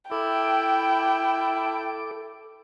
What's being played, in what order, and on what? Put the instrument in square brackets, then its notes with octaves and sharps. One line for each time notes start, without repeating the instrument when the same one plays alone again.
[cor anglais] E4 [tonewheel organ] A4 D6 [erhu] G5